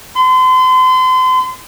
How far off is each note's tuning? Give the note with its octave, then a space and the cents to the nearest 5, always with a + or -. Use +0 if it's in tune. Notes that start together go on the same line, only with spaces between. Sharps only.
C6 -35